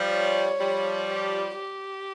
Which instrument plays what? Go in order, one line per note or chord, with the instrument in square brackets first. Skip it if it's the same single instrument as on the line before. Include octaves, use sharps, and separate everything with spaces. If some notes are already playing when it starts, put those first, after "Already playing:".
Already playing: [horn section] F3 G3
[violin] C#5
[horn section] F3 G3
[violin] G4
G4